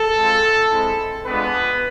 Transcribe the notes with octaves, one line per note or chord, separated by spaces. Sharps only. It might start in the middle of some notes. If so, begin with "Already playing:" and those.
Already playing: A4
G#3 C4 F4
G#3 C4 E4
G#3 B3 D4 F4 B4